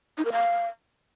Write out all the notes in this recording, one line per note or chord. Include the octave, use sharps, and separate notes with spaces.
D#4
A#4
F5